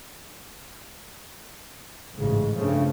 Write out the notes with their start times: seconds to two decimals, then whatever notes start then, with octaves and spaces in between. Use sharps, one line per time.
2.17 A1 G#2 C#3
2.57 G2 C#3 F3 A3